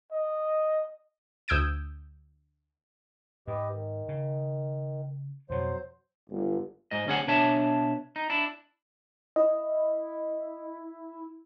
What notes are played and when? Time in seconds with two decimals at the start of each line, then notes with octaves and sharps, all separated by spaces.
0.12 D#5
1.48 D2 D#6 E6 G6 G#6 D7
3.47 G#2 G4 B4 D#5
3.74 D#3
4.09 C#3
5.50 F2 B2 F#3 C5
6.30 G1
6.91 G#2 D#5
7.07 D2 C#4 G#4 F#5
7.27 B2 D4 C#5 E5 A5
8.16 D#4
8.30 D4 E4
9.36 E4 D#5